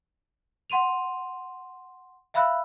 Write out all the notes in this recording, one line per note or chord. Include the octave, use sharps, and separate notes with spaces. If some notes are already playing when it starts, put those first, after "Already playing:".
F#5 C6 D#7 F7
E5 F5 B5 E6 F#6